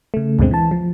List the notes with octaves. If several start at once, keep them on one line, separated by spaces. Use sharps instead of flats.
C#3 A3
D2 G2 B2 D3 G#3 C4
E3 A5
F3